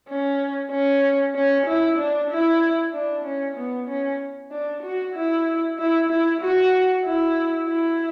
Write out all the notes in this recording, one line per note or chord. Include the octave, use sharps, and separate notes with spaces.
C#4
C#4
C#4
E4
D4
E4
D4
C#4
B3
C#4
D4
F#4
E4
E4
E4
F#4
E4
E4